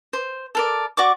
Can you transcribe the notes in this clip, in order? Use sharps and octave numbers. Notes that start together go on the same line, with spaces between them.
C5
A4 A#4 D5
F#4 D5 C#6 D6